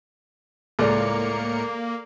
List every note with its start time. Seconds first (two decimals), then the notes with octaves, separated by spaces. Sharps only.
0.79 C#2 A2 A#3 A4 A#4 D5 C#7